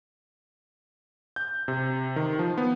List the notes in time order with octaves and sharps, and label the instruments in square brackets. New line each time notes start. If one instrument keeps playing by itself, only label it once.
[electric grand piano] G6
C3
D#3
F3
B3